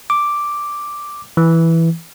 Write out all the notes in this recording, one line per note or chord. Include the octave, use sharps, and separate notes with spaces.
D6
E3